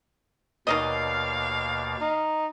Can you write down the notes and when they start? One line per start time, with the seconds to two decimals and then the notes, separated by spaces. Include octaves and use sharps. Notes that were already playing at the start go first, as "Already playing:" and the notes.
0.67 D#2 B2 D#3 F#3 D5 D#5 F5
2.01 D#4